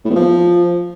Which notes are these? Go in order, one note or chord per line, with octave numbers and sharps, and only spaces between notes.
A2
E2
F3